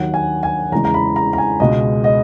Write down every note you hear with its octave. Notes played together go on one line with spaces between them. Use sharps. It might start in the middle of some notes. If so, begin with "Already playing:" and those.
Already playing: D#2 D#3 F#3 F#5
G#5
G#5
E2 C#3 E3 G#3 A#5
A#5
B5
A#5
A#5
G#5
C#2 B2 G#3 D#5
D#5